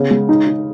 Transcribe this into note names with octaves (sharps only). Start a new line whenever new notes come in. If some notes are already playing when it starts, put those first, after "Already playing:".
Already playing: C#3 B3
G#3
D#4
D#4